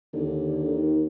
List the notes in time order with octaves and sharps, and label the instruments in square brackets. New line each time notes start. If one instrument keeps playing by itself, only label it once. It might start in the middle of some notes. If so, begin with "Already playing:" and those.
[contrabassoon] D#2 [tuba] D3
[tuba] D#3